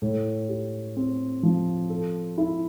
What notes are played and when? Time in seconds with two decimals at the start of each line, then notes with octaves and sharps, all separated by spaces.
0.02 A2
0.49 G4
0.96 C4
1.43 F3
1.90 A4
2.38 E4